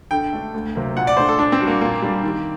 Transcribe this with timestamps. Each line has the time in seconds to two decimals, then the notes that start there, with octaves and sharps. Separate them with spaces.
0.11 D3 G5
0.33 A3 D4
0.54 D2
0.75 C3 F#3 A#3
0.96 A#2 F#5
1.07 D5
1.17 A3 D4 C5
1.28 A4
1.38 A#2 D4
1.52 C4
1.60 G3 D4 F#4
1.67 A#3
1.81 A#2 A#3
2.02 G3 D4 G4
2.23 D#3